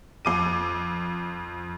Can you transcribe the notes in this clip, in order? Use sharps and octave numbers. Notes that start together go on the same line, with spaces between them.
F2 D6 D#7